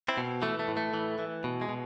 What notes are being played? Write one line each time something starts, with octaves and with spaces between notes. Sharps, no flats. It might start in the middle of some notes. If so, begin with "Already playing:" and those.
C4 E4
B2
E3 A3
A3
A2
A3
E3
E3
B2
G#3
B2